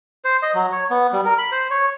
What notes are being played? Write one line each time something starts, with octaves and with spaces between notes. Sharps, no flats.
C5
D#5
F#3
C#5
B3
G3
A#4
B5
C5
C#5